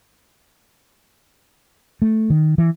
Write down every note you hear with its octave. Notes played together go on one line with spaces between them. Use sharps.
A3
D#3
E3